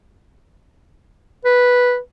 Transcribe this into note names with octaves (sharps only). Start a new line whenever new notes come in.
B4